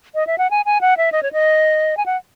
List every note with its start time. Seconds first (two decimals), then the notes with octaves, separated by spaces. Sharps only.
0.15 D#5
0.27 E5
0.38 F#5
0.51 G#5
0.65 G#5
0.81 F#5
0.97 E5
1.12 D#5
1.23 C#5
1.32 D#5
1.97 G#5
2.06 F#5